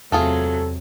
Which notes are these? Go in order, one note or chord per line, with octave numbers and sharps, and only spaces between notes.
E2 C3 F#3 A3 F4 G#4 A4